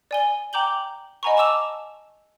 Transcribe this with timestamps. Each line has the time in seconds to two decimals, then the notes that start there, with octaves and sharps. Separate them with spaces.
0.11 D5 G#5 G7
0.53 G5 A#5 D6 G6 F#7 G7
1.23 D#5 F#5 G#5 A#5 B5 C#6
1.37 A5 C#6 D6 E6 E7 F7